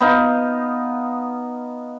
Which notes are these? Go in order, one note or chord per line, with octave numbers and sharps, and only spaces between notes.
B3 D#4 F5